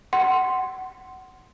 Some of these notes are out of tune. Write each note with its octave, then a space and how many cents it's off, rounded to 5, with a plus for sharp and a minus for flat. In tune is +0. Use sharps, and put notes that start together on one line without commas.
F#5 +15 C6 +0